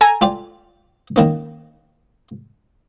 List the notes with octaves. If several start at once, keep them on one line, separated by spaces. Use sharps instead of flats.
A4 G#5 A#5
F4 G4 D5
D#3 A#3 C#4